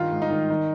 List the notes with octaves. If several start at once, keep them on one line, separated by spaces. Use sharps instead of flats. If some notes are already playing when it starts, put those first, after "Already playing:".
Already playing: G2 D#3 F4
G#2
D#4
D#3
D#3